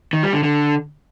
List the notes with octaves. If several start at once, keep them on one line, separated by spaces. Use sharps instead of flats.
D#3
G3
D3
D3